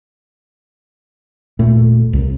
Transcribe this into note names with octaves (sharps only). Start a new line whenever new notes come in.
D#1 A#2 A3
C2